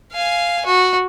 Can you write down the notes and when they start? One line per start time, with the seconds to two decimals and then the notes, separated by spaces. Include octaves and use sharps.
0.12 F5 G#5
0.65 F#4